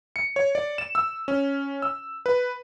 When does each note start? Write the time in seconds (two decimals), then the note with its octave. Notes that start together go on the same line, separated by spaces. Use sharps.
0.16 C#7
0.36 C#5
0.55 D5
0.78 E7
0.95 E6
1.28 C#4
1.82 E6
2.26 B4